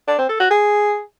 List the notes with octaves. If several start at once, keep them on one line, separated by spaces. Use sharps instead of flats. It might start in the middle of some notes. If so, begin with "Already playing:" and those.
D4
C4
A4
F#4
G#4